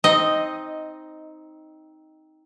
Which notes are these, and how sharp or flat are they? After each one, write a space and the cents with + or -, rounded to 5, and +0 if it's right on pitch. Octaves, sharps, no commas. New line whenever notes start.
C4 +0 D#4 +10 D#5 +0